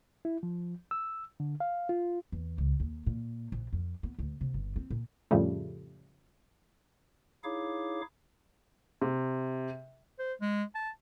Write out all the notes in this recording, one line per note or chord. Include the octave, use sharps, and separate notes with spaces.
E4
F3
E6
D3
F5
F4
E2
C#2
D#2
A#2
A#1
F2
B3
D2
C3
G1
C4
A#2
F2 A2 C#3 F3 G3 A3
D#4 E4 G#4 C#5 F5 D6
C3
C5
G#3
A5